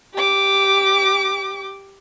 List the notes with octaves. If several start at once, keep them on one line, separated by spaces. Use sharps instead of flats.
G4 D6